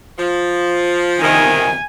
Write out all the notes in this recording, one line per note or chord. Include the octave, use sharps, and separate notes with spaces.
F3
F2 C3 D#3 G#5